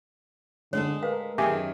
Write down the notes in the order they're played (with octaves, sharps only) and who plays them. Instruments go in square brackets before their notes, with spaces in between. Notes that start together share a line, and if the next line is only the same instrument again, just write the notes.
[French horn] D3 [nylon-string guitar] G#3 G#4 A4 [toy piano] C#5
[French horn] A#4 [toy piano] B4 F5
[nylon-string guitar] F#2 D#3 [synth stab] G4 G#4 [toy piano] E5